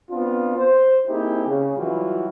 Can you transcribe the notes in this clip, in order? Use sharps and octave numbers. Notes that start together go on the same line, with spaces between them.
B3 C4 D4 F4
C5
A#3 C4 D#4 E4 G4 G#4
C#3
E3 F#3 G3 F4 F#4